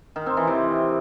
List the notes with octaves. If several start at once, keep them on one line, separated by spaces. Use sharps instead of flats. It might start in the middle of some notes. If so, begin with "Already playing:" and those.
D#3
C4
E3
C3